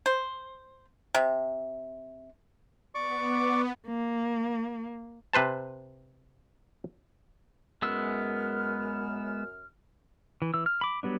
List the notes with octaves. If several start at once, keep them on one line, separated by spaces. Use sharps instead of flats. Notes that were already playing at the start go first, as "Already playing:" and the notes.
C5
C3
B3 D5 C#6 D6
A#3
C3 B4 C5 A5
F#2 G#3 B3 E6 F6
E3
E3 E6
F6
B5 D6
F#3 G3 B3 D4